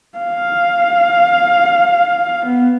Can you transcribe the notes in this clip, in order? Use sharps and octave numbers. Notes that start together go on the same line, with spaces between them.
F5
B3